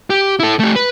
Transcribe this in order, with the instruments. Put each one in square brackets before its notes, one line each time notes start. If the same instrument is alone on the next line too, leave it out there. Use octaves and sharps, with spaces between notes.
[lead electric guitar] G4
E4 A4
A3 G4
B4